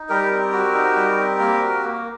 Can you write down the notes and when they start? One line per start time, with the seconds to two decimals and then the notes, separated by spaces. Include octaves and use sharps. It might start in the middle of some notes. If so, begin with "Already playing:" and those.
Already playing: D#4
0.09 G3 G4 A#4
0.31 C4
0.52 F#4
0.74 D#4
0.96 G3
1.18 C4
1.40 A#3
1.62 F#4
1.83 A#3